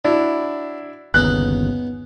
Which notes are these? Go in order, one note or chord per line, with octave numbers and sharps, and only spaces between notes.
F#3 D4 E4
G1 D#2 C#3 B3 C#4 D#4 F#6